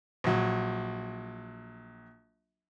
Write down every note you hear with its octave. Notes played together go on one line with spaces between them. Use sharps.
A#1 F#3